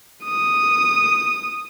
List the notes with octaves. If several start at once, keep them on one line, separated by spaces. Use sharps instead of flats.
D#6